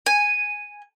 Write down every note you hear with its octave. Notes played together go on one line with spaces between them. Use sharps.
G#5